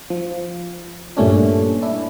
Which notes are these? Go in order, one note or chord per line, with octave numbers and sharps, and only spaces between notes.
F3
G2 A#2 A3 C#4 D4
D4 E4